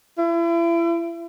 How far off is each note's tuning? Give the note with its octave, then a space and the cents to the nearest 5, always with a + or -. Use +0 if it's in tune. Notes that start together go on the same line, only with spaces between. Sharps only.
E4 +35